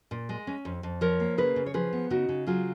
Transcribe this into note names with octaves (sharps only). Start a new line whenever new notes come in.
A#2
G#3
C#4
F2
F2
F3 A#4 C#5
A#3
C#3 G#4 B4
C#3
C#5
F3 G#4 B4
B3
C#3 D#4 F#4
C#3
F#3 F4 G#4